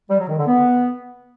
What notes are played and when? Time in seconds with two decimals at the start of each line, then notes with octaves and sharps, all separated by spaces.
0.10 G3
0.19 F#3
0.28 D#3
0.38 D3
0.47 B3